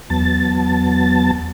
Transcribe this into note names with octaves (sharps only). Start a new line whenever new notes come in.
E2 F#3 B3 A5 A6